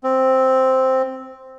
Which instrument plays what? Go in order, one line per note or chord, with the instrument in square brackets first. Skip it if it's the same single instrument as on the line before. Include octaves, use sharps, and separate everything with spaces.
[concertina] C4